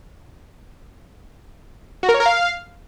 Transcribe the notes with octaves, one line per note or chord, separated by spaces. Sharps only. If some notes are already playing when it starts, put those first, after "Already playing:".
F#4
A#4
C#5
A#4
F5